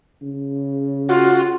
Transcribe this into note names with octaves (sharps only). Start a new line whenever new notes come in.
C#3
F4 F#4